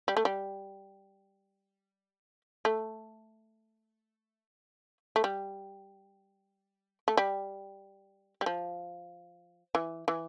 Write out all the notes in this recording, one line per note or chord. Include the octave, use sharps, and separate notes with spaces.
G3
A3
G3
A3
A3
G3
A3
G3
G3
F3
E3
E3